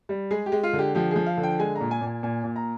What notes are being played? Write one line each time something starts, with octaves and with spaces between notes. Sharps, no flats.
G3
G#3 G#4
G4
G#3
F4
D3
G4
F3 G4
F3 G#4
F5
D3
G5
G#3 G#5
A#2 A#5
G#5
A#2
G#5
A#2 G#5
A#2
A#5